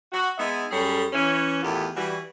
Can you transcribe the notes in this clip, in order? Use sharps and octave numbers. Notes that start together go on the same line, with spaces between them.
F#4
G#3 B3 D#4 E5
F#2 G3 C#4 G#4 A4
E3 C#4
E2 A2 D#3 B3 F4 G4
E3 G3 F#4